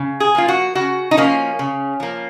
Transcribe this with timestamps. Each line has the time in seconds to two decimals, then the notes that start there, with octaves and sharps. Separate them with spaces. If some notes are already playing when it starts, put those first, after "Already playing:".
Already playing: C#3
0.20 G#4
0.35 F3 A#3 F4
0.48 F#4
0.75 C#3 F#4
1.11 D#4
1.17 F3 A#3 C#4
1.59 C#3
2.00 F3 A#3